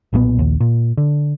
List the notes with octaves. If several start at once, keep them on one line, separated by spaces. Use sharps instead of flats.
B1 A#2 G3 B3
A#1 D#2
A#2
D3